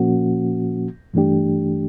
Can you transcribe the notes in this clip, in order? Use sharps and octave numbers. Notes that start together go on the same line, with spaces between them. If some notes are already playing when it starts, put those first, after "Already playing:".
Already playing: A#2 F3 A#3 C#4 F#4
G2 E3 A3 D4 G4